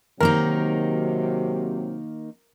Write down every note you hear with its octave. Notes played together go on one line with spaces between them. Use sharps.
C3 D#3 F#3 A#3 D#4 A#4